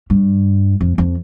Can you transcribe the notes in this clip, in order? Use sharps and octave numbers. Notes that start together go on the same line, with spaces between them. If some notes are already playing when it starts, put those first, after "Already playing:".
G2
F2
F2